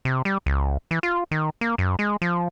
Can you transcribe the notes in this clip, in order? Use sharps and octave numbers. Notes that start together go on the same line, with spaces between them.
C3
G3
C#2
E3
F4
D#3
A#3
F#2
G#3
F3